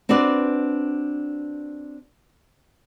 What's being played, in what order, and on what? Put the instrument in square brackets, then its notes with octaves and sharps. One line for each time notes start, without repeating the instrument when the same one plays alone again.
[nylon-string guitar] C4 D4 F#4 B4 D5